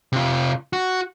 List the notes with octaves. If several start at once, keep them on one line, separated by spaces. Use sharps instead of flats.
C3 F4
F#4